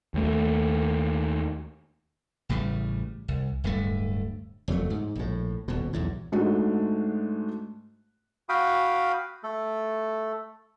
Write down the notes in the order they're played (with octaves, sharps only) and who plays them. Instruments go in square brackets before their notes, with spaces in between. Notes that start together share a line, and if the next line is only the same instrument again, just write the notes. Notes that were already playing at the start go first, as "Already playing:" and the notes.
[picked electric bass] D#2 A3
[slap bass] A1 A2 C#3 G3
C2
D1 G2 A3
F#1 F2 F#3 A3
G#2
A#1 A2
D#1 B2
B1 E2 G#2
[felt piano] G#2 G#3 A3 D4 F#4
[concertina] F#4 F5 G5 B5 D#6
A3 A4